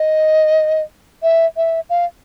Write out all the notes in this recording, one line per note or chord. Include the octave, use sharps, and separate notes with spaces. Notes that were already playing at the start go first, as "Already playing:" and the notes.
Already playing: D#5
E5
E5
F5